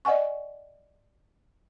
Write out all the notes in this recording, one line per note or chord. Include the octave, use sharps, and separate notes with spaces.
D5 D#5 F#5 G#5 C#6